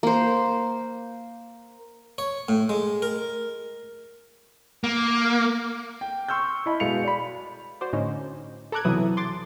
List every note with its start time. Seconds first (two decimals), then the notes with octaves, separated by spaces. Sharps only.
0.03 A#3 C5
2.18 C#5
2.49 A2
2.69 G#3
3.02 A#4
4.84 A#3
6.01 G5
6.28 C6 C#6 E6 F6 G6
6.66 E4 D#5 A5 B5
6.80 B2 G#3 F5 C#7 F7
7.04 D5 B5
7.81 F#4 C5 D5
7.93 A2 D3 C#4 D#4
8.72 A4 A#5 D6 F#6 G#6
8.85 B1 C3 E3 F#3 E4 D#6
9.17 C6 D6 A6